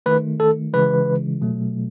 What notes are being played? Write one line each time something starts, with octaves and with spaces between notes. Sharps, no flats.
D#3 A3 B4
A4
C#3 E3 G#3 B4
B2 F#3 A3